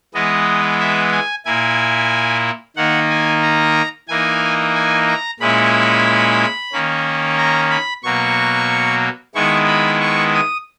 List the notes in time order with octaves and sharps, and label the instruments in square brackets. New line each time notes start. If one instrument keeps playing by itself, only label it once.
[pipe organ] E3 G#3 B3 D#5
E5
G#5
A#2 A#3 E4 G#5
D#3 A#3 D#4 F#5
G#5
A#5
E3 A#3 D#4 G#5
G#5
A#5
A#2 G#3 C#4 E4 B5
D#3 A#3 C#4
A#5
B5
B2 F#3 A#3 C#6
D#3 G#3 B3 E4 C#6
B5
C#6
D#6